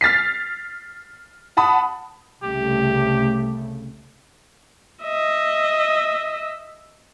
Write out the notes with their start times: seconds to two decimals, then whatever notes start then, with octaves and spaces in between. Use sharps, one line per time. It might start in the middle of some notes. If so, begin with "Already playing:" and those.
0.01 F6 A6 B6 C7
1.57 F#5 A5 B5 D#6
2.43 C2 C#3 A3 G4
5.03 D#5 E5